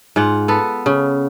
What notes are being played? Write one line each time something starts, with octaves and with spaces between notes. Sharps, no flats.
G#2 F4 F#5
B3 A4 B4
C#3